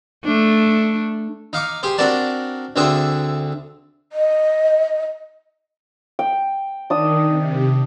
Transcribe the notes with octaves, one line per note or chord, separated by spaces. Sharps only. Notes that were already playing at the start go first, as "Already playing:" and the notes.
A3 D4
D#4 F5 C#6 D6
G4 G#4 C5
C4 D4 F#4 A#4 D5 A5
D2 D3 C4 D4 G#4 E5
D#5
G5
D#3 D4 D#6 E6
C3